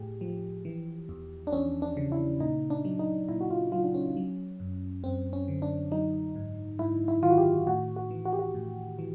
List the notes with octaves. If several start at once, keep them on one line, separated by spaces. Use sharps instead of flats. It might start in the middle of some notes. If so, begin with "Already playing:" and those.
Already playing: A2 G4 G#4
F3
E3
E2
D4
E2 C#4
D4
C#3
E4
A#2 D#4
D4
F#3
D#4
A#2 E4
F#4
F4
F#3 F4
D4
C#4
F#3
F#2
F#2 C4
C#4
D3
D4
F#3 D#4
G#2
G#2 E4
E4
D#3 F4
F#4
G4
A2 F#4
F#4
E3
F#4
G4
F#4
A2
E3